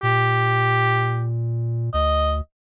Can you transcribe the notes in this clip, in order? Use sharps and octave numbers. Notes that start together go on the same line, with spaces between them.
A#2 G4
D2 D#5